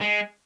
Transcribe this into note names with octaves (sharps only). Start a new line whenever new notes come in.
G#3